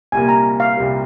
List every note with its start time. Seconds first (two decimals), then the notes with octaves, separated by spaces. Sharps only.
0.12 C2 A#2 G3 A#3 G#5
0.29 A#5
0.60 F5
0.76 C2 A#2 G3 A#3